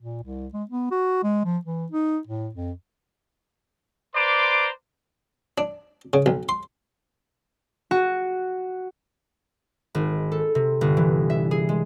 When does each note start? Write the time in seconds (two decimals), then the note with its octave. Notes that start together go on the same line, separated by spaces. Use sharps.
0.01 A#2
0.23 C2
0.54 G#3
0.70 B3
0.91 F#4
1.23 G#3
1.45 F3
1.65 E3
1.92 D#4
2.27 A2
2.55 F2
4.15 B4 C5 D5 A#5 C6 D6
5.58 D4
6.13 C#3
6.26 B1
6.49 C6
7.91 F#4
9.95 G#1
10.32 A4
10.55 C3
10.81 G1
10.97 E3
11.30 E5
11.51 G#4
11.69 G#3